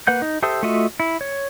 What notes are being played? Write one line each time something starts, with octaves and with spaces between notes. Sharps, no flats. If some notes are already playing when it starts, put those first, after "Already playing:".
A#3 B4 F#5 G6
D#4
G4 A4 C5 E5 D#6
A3 F4 F#4 D#5 E5
E4
C#5